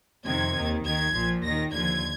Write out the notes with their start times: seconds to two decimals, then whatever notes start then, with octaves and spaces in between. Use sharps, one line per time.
0.25 F2 C3 D#3 G#6
0.54 D#2 D#3
0.84 D#2 D#3 G#6
1.12 A#1 A#2 F3
1.42 D#2 D#3 A#6
1.71 D#2 D3 F3 G#6